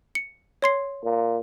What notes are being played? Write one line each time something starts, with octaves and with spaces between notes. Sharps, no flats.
C#7
C#5 C6 C7
A#2